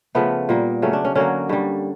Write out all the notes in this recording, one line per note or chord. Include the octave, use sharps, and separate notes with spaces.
C#3 F3 A3 B3
A#2 G3 A#3
C#3 F#3 A3 C#4
D4
C#4
D3 F#3 A#3 C#4
G2 D3 G3